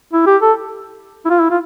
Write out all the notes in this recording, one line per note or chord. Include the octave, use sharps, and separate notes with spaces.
E4
G4
A4
E4
F4
E4
F4